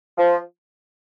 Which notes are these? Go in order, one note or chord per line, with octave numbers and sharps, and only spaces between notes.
F3